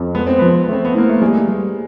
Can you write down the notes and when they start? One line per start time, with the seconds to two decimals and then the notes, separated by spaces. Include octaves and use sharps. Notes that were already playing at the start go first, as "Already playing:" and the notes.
Already playing: F2
0.15 G#3 B3
0.27 C4
0.39 F3 B3
0.68 A3 C4
0.85 B3
0.95 A#3 E4
1.09 A3
1.21 G3 G#3
1.48 G3